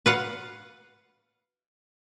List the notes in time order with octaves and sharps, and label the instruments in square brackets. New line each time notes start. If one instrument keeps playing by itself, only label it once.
[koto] B4 F5 F#5